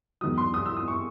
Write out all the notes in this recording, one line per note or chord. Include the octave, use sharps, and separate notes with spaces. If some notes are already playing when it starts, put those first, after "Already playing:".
E2 D#3 F#3 D#6
C6
D#6
E6
D#6
C#6